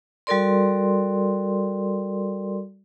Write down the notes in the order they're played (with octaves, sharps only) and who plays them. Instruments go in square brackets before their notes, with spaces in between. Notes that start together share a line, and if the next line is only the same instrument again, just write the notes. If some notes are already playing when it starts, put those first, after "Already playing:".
[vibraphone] G3 F#4 A4 A#4 D5 C6